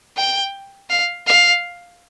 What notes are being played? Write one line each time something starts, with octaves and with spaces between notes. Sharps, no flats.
G5
F5
F5